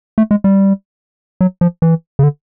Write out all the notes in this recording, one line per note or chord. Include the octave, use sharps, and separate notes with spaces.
A3
G#3
G3
F#3
F3
E3
C#3
D3